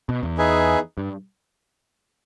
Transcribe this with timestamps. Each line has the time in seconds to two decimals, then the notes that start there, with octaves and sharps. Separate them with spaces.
0.09 B2
0.23 E2
0.38 D#4 G#4 B4 E5 G#5
0.98 G2